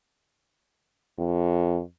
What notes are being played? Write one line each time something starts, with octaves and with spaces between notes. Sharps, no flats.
F2